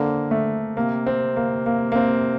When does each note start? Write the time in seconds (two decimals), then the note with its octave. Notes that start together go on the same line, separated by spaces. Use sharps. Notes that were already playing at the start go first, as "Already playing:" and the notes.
Already playing: D3 A#3 C4
0.31 A3
0.77 C3 A#3
1.07 C4
1.37 A#3
1.66 A#3
1.92 A#3
1.96 C4